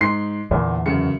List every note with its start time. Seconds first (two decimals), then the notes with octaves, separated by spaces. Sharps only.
0.01 G#2 C6 C7
0.51 E2 A#2 D3
0.86 F#2 C#3 C#7